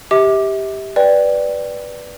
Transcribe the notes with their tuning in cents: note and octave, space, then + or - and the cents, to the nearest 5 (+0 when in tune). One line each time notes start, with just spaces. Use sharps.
G4 +0 E5 -35 D6 +10
B4 +0 D5 +0 G5 +0